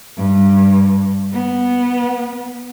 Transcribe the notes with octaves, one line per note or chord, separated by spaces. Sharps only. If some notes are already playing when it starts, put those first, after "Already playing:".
G2
B3